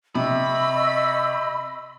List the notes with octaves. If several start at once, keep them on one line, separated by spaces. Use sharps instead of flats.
C3 D#5 B5 C#6 E6